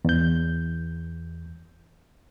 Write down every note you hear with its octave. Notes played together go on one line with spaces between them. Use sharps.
E2 G6